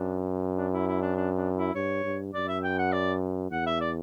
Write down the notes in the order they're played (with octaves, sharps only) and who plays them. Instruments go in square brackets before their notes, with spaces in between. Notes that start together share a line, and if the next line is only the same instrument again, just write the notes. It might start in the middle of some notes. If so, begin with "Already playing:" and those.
Already playing: [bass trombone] F#2 [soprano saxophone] D4
[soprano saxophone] D4
E4
E4
D4
D4
D4
E4
[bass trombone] G2 [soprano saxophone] C#5
[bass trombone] G2
[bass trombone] F#2 [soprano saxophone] D5
[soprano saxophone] E5
G5
F#5
D5
[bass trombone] E2 [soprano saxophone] F#5
[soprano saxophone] E5
D5